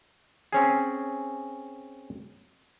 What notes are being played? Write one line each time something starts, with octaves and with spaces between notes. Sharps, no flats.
C4 C#4 G#4